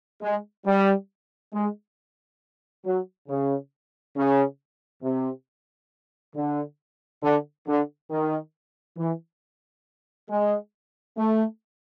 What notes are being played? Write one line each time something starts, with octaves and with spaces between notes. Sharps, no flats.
G#3
G3
G#3
F#3
C#3
C#3
C3
D3
D3
D3
D#3
E3
G#3
A3